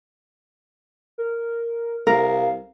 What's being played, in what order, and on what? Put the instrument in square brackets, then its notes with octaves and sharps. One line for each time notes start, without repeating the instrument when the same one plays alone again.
[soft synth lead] A#4
[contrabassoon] C2 [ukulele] A#4 [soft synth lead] F5